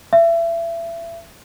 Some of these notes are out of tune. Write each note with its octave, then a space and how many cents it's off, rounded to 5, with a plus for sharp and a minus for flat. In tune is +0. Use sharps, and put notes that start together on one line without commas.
E5 +30